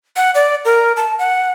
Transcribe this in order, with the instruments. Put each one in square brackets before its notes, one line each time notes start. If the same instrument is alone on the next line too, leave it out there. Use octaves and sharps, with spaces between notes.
[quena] F#5
D5
A#4
A5
F#5